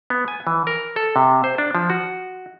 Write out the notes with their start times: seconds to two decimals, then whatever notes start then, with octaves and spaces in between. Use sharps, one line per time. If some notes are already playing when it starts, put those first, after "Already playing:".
0.10 B3
0.28 G#5
0.47 E3
0.67 A#4
0.96 A4
1.16 C3
1.44 C5
1.58 D4
1.75 F3
1.90 F#4